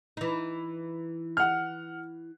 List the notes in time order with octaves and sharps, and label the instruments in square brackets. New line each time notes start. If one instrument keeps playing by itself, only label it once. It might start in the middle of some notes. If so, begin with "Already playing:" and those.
[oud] E3 D#4
[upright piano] F#5 F6